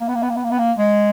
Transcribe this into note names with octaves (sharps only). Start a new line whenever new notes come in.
A#3
B3
A#3
B3
A#3
B3
A#3
B3
A#3
G#3